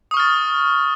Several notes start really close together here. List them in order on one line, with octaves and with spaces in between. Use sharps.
D#6 C#6 F6 A6